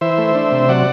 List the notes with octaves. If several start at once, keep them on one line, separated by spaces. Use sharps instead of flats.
E3 C5 E5
A3
D4
C3
F#3 D5 F#5